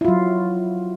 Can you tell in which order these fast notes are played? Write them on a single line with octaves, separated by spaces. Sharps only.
E4 F4 F#3